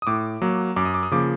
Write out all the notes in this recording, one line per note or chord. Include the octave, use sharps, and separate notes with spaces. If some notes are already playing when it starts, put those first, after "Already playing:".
D#6
A2 D6
F#3 A#3
F#2 D6
D#6
D6
D#6
C#3 F3 A#3 D6